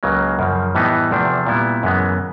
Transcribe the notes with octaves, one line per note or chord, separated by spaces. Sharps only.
C#2 C#3 F#3 A#3
F#2 C#3 F3
A2 E3 G3 B3 D#4
E2 C3 F3 A3 D4
A#2 G3 B3 E4
F#2 C#3 E3 G#3 B3